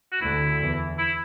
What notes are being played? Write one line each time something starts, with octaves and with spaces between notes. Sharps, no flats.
F#4
D2 D3 E4
E2 E3
E4